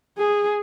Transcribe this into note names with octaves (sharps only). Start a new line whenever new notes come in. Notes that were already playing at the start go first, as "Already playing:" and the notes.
G#4